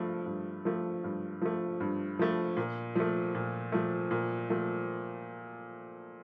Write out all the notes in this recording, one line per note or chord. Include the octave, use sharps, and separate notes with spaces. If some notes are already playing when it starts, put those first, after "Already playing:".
Already playing: G2 F3 A3
G2
F3 A3
G2
F3 A3
G2
F3 A3
A#2
F3 A3
A#2
F3 A3
A#2
F3 A3